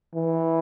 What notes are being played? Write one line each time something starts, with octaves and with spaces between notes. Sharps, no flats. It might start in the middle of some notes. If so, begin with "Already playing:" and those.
E3